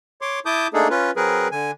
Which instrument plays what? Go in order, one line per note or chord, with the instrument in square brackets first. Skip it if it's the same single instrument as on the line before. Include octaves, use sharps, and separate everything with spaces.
[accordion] C#5 C6 D6
E4 A5 D6 D#6 G6
A3 A#3 D4 D#4 G#4 A4
C#4 F4 B4
F#3 C4 G#4 A#4 B4
D3 G#5